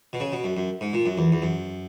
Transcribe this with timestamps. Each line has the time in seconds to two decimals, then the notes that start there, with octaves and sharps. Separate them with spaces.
0.13 B2
0.20 C#3
0.32 B2
0.44 F#2
0.57 F#2
0.81 G#2
0.93 A#2
1.06 F#2
1.18 E2
1.32 E2
1.42 F#2